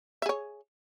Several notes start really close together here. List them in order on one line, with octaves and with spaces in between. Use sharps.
E5 G#4 C#5